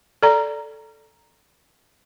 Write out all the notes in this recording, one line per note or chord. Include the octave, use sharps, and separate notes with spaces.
A4 D5 A#5